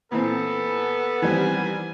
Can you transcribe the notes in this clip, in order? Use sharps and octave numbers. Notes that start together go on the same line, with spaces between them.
A#2 E3 B3 C4 A4
D#3 E3 G3 C4 G#5